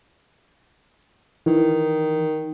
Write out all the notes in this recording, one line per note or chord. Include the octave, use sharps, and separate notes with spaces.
D#3 E3